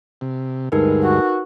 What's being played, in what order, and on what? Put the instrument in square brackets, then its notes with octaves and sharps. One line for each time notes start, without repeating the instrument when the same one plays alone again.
[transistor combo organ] C3
[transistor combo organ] D2 G2 G#3 [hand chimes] D#4 A#4 B4
[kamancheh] F#4